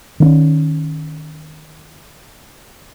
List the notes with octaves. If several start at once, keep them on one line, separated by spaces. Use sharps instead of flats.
D#3 C4 C#4